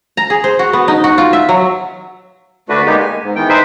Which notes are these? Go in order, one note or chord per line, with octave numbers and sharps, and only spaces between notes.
A#5
G#4
C5
F#4
B3
D#4
F#4
F4
E5
F#3
D2 A3 D4 F#4 B4
G#3 A#3 B3 D#4 G4
G#5
G#2
D#3 E3 B3 G5
D#4 G#4 B4 C5 E5